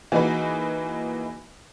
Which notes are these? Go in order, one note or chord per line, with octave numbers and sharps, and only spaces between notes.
E3 A#3 D#4 F#4 G#4 B4